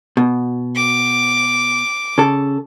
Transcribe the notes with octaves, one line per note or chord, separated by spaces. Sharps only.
B2
D6
C#3 A4